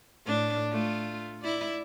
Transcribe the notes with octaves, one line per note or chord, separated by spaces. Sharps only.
A2 D4
A3 F4
E4 D5